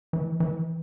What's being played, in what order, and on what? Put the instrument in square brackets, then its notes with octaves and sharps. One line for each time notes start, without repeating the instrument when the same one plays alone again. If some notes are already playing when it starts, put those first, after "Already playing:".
[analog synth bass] E3
E3